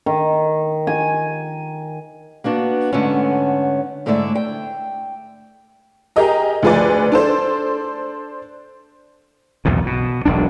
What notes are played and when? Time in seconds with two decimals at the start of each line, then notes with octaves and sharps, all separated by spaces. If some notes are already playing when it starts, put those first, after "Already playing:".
0.06 D#3
0.87 G#5
2.44 A#3 B3 D4 F#4
2.93 G#2 D3 A3 B3 C#4
4.06 G#2 D3 A3 E4 D5 E5
4.35 G5
6.16 G4 G#4 A#4 D#5 A#5
6.63 D2 F3 G#4 B4 D5
7.12 D4 A4 C5
9.65 B1 E2 G2 A#2
9.86 B2
10.25 E1 B1 D4